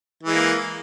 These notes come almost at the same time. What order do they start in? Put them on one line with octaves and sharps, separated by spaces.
E3 G#3 A#3